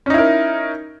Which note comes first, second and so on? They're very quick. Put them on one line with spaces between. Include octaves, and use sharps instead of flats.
C#4 D#4 E4 A#4